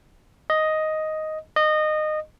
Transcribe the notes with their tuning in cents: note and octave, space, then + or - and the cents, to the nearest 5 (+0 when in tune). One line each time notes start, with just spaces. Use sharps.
D#5 +5
D#5 -20